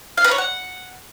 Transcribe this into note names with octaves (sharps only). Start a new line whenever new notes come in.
F5
B4
C#5
F#5